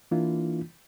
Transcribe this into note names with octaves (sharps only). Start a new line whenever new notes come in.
E3 A#3 D4 E4 F4